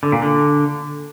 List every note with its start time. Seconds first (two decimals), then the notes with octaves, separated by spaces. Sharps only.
0.03 D3
0.12 A#2
0.22 D3